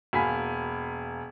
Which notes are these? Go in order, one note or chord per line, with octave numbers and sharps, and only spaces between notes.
E1 A#3 G#5 B5 B6